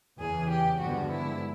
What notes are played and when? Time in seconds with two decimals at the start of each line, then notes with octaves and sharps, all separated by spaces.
0.19 E2 C#3 E3 G#4
0.49 G4
0.80 G2 D3 F3 G#3 B3 F#4
1.10 E4